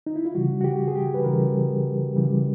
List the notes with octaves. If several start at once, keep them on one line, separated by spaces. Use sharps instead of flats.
D#4
E4
F4
C#3 E3 G3 F#4
F#4
G4
G#4
G4
B4
C#3 E3 G3 A#4
C#3 E3 G3